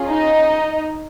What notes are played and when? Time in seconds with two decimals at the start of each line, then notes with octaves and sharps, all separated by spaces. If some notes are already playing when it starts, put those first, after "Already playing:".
Already playing: C#4 F4 G#4
0.09 D#4 D#5